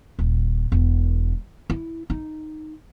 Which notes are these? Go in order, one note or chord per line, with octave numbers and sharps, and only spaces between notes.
D#1
E1
E4
D#4